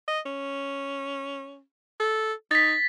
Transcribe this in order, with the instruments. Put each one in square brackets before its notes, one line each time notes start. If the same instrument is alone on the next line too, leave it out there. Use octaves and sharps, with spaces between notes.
[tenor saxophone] D#5
C#4
A4
[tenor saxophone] D#4 [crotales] A6 B6